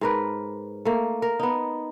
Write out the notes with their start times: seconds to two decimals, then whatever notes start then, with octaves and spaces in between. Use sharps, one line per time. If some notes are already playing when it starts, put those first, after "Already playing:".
0.01 G#2 A#4 B4
0.85 A3 A#3
1.22 A#4
1.40 B3 D#4